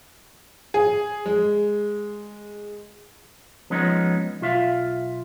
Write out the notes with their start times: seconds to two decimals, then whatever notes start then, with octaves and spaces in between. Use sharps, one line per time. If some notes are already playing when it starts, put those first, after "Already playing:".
0.74 G#4
1.26 G#3
3.70 F3 G#3 B3 C#4 D#4
4.41 B1 F4 E5 F5